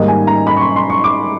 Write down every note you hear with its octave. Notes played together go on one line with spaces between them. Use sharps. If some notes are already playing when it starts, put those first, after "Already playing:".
Already playing: G#2 D#3 G3 A#3 D#5
G#5
A#5
B5
C#6
C6
C6
C#6
D6